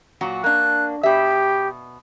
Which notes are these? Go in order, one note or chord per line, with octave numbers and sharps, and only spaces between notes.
A#2 F#3 F#4
A#3 D4 F#6
B2 G4 E5